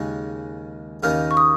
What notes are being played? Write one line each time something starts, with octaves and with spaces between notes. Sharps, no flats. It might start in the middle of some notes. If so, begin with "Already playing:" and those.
Already playing: D#2 C#3 G#3
D#2 C#3 A#3 D#4 F6
C#6
D#6